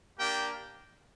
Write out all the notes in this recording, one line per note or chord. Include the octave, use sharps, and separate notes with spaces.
A#3 D4 G4 G5